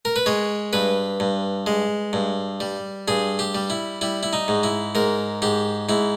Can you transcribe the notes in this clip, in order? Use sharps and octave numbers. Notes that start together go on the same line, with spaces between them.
A#4
B4
G#3 C#5
G2 B4
G2
G#3
G2
G3
G2 G#4
G4
G3
E4
G3 E4
E4
D#4
G#2
E4
G#2 A#4
G#2 G4
G#2 E4